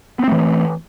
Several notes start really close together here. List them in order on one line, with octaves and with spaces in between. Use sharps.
B3 C4 A3 E3